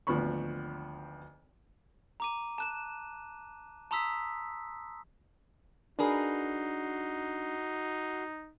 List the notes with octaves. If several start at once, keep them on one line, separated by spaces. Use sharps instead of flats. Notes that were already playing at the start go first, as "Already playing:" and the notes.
G#1 D2 F3 B3 B5 C#6
A#5 D6 D#7
A5 F#6 E7
A5 A#5 C6 D#6 E6 B6
D4 D#4 F#4 G#4 A#4 B4 C6